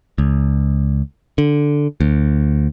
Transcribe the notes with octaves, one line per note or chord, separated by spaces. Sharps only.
C#2
D3
D2